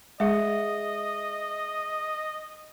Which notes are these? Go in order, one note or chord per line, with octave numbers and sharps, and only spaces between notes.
G#3 G#4 D#5 E5